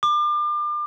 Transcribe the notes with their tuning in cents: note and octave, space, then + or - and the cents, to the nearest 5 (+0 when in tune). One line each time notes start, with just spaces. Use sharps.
D6 +35